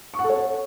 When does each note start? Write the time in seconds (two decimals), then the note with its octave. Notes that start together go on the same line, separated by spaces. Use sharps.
0.14 C#6
0.19 F#5
0.24 A4
0.30 C#5